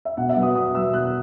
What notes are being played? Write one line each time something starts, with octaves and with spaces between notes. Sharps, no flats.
E5
B2 F#5
E5
F#3 B3
D#6
B2 D#6
F#3 B3 E6
B2 F#6